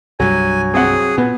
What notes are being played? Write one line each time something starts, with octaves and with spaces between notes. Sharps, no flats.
C2 G2 F#3 G3 G#5
C4 G#4 F#5
A#2 B3